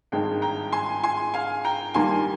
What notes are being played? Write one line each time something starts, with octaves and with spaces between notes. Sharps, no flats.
G#1 G2 D#3 G#3 G5
G5 A#5
G#5 C6
G#5 C6
F5 G#5
G5 A#5
G2 D#3 G3 A#3 G#5 C6